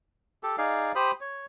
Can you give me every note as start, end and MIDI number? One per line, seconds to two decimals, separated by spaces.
0.43 0.56 67
0.43 0.56 69
0.58 0.92 63
0.58 0.92 68
0.58 0.92 74
0.58 0.92 77
0.95 1.11 67
0.95 1.11 72
0.95 1.11 83
0.95 1.11 87
1.21 1.46 73